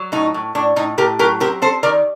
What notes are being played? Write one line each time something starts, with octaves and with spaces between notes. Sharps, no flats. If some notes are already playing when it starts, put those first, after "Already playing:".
Already playing: F#3
A2 D#4
A2
A2 D4
A2 D#4
A2 G4 A#4
F#3 G4 A#4
C4 G4 A#4
C4 A4 C5
D#3 A#4 D5